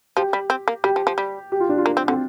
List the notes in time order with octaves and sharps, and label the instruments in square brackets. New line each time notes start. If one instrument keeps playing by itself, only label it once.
[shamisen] F3 [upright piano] G4
[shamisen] G3
C4
A#3
[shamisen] G3 [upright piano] G4
[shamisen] F3
F3
G3
[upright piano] G4
F4
D4
F4
[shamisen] A#3
C4
[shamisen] D3 [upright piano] C4